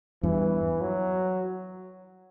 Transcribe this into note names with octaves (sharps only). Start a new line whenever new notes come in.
E2 G2 E3
F#3